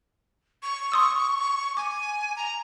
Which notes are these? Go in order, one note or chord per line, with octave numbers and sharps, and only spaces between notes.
C#6
C6 D#6 E6
G#5 D6
A#5